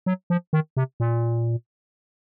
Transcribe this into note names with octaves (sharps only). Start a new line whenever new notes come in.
F#3
F3
D#3
C3
A#2